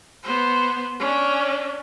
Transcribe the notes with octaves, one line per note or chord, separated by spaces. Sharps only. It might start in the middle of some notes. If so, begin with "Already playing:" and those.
B3 C5
C#4 D4